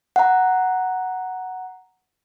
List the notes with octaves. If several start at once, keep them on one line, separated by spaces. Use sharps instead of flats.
F#5 A#5